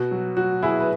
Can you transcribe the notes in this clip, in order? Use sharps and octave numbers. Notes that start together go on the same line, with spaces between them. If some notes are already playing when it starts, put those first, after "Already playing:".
Already playing: B2 F#4
F#3
F#3 F#4
B2 E4 G#4
B4